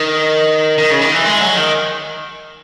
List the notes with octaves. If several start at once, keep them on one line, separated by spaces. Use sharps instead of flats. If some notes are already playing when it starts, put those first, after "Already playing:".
Already playing: D#3
D#3
C#3
D#3
E3
G#3
F#3
D#3